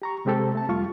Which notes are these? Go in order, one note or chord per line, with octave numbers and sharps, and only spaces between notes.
G4 A#5 C#6
C3 G#3 C4 G4 A4
A3 A5
F2 G3 F4 C#6